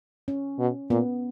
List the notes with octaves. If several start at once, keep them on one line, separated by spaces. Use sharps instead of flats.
C#4
B2
A#2 B3